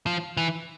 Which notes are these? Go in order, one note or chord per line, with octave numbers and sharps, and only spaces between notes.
F3
E3